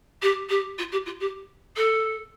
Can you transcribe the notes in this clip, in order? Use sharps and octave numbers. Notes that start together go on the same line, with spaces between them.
G4
G4
F4
G4
F4
G4
A4